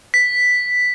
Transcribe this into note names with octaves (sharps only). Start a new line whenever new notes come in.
B6